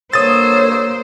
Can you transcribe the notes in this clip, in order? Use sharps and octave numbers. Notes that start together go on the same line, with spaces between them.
G2 D3 A#3 C5 C#5 D#6 E6 A6